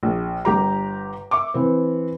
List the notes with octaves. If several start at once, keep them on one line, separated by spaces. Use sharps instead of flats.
A#1
G1 G4 A#5
E5 C#6 D6
E3 C4